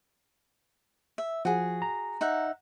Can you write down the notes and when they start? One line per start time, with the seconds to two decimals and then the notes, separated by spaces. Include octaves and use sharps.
1.18 E5
1.45 F3 F#4 G#4
1.82 A#5
2.21 D#4 E5 F#5